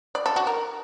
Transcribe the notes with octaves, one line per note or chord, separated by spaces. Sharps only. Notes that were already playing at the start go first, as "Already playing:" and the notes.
D5
A4
F#4
A#4